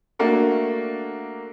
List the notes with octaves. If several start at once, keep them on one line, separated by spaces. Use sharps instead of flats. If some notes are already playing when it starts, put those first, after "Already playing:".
A3 A#3 D4 F#4